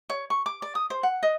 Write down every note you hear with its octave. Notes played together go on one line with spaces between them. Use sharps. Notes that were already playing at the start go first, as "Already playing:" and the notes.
C#5
C#6
D6
D5
D#6
C5
F#5
D#5